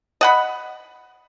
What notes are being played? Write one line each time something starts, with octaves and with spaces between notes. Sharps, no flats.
D#5 F#5 B5